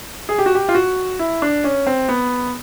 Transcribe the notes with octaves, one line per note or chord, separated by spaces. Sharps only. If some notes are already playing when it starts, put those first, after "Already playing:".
G#4
G4
F#4
G4
F4
F#4
E4
D4
C#4
C4
B3